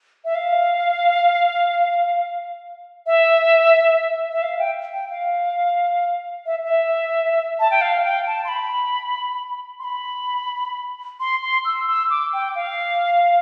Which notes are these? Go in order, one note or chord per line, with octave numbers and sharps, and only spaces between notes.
E5
F5
E5
E5
F5
G5
G5
F5
E5
E5
A5
G5
F5
G5
A5
C6
B5
C6
B5
C6
C6
E6
E6
D6
G5
F5